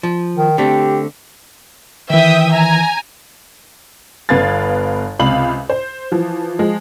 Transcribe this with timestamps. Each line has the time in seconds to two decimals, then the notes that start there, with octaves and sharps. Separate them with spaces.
0.03 F3
0.37 D#3
0.58 D3 A3 C4 G4
2.10 D#3 E3 E5 G5 D#6
2.52 G#5 A#5
4.29 G1 B3 B4 F5 G#6 A6
5.19 C#2 C3 F5 B5 F#7
5.70 C5
6.12 E3 F3
6.59 F3 G#3